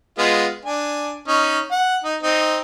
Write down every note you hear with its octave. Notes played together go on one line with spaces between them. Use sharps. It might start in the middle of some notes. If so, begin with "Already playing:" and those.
G#3 B3 F4
D4 G#5
C#4 D#4
F#5
D#4
C4 D#4